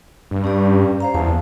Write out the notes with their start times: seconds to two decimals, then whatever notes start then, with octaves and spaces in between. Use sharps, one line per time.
0.31 G2
0.44 C#4 G4 D5
1.00 C5 F5 A#5
1.14 E2 A5